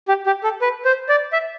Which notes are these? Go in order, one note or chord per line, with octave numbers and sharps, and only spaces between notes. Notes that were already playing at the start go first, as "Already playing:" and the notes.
G4
G4
A4
B4
C5
D5
E5